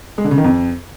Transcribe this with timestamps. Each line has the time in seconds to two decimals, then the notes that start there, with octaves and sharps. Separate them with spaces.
0.18 G#3
0.25 D3
0.31 C#3
0.38 D#3
0.44 F2